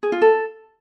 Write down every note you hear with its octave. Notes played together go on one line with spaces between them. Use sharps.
G#4
F4
A4